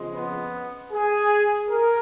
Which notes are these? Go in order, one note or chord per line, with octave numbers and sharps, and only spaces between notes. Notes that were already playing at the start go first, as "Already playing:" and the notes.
Already playing: F2 C#3 F3 G#3
B3
G#4
A#4